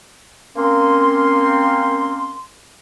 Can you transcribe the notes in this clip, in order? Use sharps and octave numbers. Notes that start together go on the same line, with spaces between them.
A#3 C4 C#4 C6